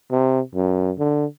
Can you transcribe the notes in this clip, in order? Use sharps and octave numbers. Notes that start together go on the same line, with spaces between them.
C3
F#2
D3